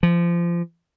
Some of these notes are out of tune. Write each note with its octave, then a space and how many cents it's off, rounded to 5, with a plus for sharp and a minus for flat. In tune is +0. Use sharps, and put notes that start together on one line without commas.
F3 -25